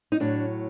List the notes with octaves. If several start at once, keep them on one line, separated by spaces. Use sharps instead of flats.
D#4
A2 F#3 D4